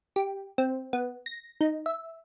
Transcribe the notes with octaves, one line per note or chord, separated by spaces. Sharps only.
G4
C4
B3
A#6
D#4
E5